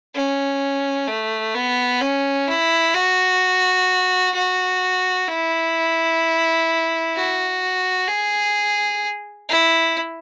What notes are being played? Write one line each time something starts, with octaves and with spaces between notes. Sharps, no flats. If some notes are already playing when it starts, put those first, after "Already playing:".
C#4
A3
B3
C#4
E4
F#4
F#4
E4
F#4
G#4
E4